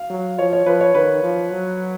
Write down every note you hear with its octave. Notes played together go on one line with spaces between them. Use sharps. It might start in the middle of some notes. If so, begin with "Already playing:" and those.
Already playing: F5
F#3
F3 C#5
C#5
F3 B4
C#5
D#3 B4
F3
F#3